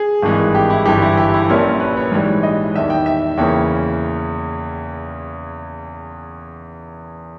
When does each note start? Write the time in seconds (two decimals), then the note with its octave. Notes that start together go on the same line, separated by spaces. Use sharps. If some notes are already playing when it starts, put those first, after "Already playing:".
Already playing: G#4
0.23 G#1 G2 E3 G#3
0.55 G4
0.70 E4
0.85 G1 G2 E3 G4
1.02 E4
1.17 G4
1.34 E4
1.49 A#1 A#2 G3 C#4 A#4
1.80 B4
1.97 C#5
2.12 G#2 E3 G3
2.43 D#5
2.75 E2 D#3 G3 E5
2.90 G5
3.06 E5
3.37 E2 C#3 E3 A#3 C#4 G5